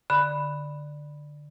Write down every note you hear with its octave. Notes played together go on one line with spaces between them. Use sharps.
D3 B5